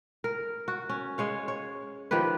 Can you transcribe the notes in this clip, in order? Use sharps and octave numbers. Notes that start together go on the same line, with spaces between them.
A#4
F#4
C#4
G#3 C#5 F5
C#5
D#3 F3 G4 B4